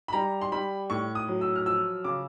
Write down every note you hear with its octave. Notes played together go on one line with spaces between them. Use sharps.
B5
G3 A#5
C6
G3 B5
A2 C#6
D#6
F#3
E6
F6
F3 E6
C#3 D6